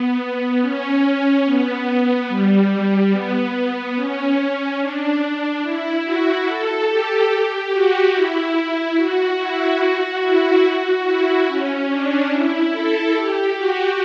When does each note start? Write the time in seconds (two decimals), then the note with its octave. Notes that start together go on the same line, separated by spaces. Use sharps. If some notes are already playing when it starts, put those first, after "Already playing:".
Already playing: B3
0.61 C#4
1.45 B3
2.28 G3
2.70 G3
3.11 B3
3.53 B3
3.95 C#4
4.79 D4
5.62 E4
6.04 F#4
6.46 A4
6.88 G4
7.29 G4
7.71 F#4
8.13 E4
8.96 F#4
9.38 E4
9.80 F#4
10.22 E4
10.63 F#4
11.05 E4
11.48 C#4
11.90 D4
12.31 E4
12.72 A4
13.14 G4
13.56 F#4